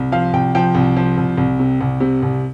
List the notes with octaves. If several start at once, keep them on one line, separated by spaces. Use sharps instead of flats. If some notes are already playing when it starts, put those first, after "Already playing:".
Already playing: C2
F3 F5
C2 G5
F3 G5
C2
F3
C2
C2
C3
C2
C3
C2